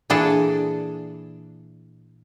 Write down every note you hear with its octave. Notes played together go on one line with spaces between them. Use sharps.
A#2 E3 D4 G#4 A4